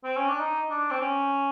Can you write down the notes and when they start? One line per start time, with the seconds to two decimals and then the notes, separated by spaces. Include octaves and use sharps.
0.04 C4
0.16 C#4
0.28 D4
0.40 D#4
0.70 D4
0.91 C4
1.00 C#4